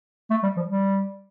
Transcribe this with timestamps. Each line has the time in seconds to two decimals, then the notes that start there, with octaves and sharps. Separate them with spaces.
0.30 A3
0.43 G3
0.57 F3
0.69 G3